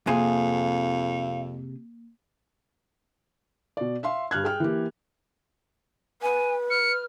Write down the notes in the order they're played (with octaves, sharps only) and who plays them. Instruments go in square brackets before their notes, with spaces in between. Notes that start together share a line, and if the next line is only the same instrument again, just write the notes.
[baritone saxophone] F2 [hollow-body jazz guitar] C3 G#4 [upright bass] A#3 [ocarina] F5
[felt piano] B2 D5
E5 F5 C6
G2 G3 F6 F#6 G#6
G#4 G5 F6
E3 A#3 G4
[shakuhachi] B4 [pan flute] G#5
[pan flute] F6 [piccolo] C#7